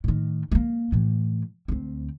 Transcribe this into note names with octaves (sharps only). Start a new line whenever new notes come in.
A2 D#3
A3 A#3
A2 E3
D2 C4